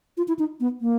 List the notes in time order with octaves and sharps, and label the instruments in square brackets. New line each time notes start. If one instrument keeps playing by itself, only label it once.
[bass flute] F4
E4
D#4
B3
A#3